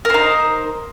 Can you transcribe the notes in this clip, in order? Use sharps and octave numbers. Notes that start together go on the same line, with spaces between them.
D#4 A#4 C5